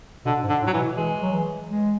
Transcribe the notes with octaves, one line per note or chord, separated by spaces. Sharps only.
B2 D3
G#2
D3
A2
F#3
E3
B2
E3 G#3
F#3
E3
G#3